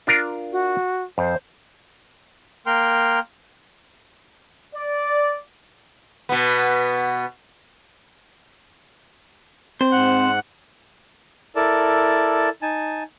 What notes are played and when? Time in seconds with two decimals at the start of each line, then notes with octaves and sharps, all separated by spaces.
0.07 D4 F4 A#4
0.52 F#4
1.18 F2 C5
2.66 A#3 A#4 G5 C6 F6
4.75 D5
6.29 B2 B3
9.81 C4 C5
9.92 G#2 F#5 F#6
11.56 E4 A4 A#4 D5 A5
12.62 D#4 G#5 A5